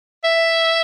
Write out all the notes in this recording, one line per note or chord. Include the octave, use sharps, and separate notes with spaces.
E5